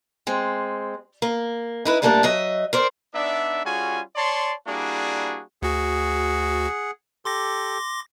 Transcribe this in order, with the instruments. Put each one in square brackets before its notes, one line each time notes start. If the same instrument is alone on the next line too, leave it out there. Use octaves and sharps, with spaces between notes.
[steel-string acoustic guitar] G#3 C4
A#3
D#4 E4 B4
A#2 G3 A3 A#3 D4 A4
F#3 D#5 E5
A#4 C5 D5
[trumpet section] B3 D4 D#4 D5 E5
G3 C#4 F4 F#4 G#4 G#5
C#5 D5 A5 C6
G3 A#3 D4 E4 F#4 G#4
[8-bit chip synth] D2 F#4 [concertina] G#4 F#5
[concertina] G4 A4 [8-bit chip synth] C6 D6 A#6